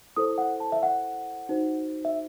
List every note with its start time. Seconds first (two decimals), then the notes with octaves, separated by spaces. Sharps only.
0.16 E4 A4 C5 D#6
0.38 F#5
0.60 A5
0.72 E5
0.83 F#5
1.49 D#4 F#4 C5
2.05 E5